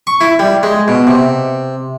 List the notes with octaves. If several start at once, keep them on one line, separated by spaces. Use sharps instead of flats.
C#6
E4
G3
G#3
B2
C3